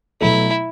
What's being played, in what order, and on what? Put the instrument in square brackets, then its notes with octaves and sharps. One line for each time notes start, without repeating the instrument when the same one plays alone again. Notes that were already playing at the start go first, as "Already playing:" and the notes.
[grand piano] B2 F#3 A3 [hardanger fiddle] E4